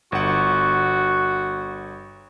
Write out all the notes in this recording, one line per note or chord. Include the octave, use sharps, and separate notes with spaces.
G1 F#4 F#5